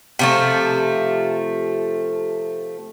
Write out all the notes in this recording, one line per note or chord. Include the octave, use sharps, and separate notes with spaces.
C3 F3 A3